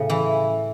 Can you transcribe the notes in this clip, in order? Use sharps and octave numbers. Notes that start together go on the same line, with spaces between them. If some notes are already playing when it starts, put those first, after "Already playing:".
Already playing: A2 C#3
E3